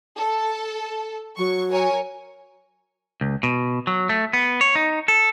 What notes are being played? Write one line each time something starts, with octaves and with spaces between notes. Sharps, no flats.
A4
F#3 C#6
A#4 C#5 G#5
C#2
B2
F#3
A3
B3
C#5
D#4
A4